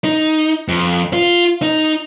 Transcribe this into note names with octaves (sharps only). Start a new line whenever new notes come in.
D#4
F2
F4
D#4